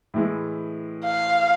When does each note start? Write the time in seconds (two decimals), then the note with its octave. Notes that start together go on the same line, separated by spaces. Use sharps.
0.14 A2 E3 G#3
1.04 F5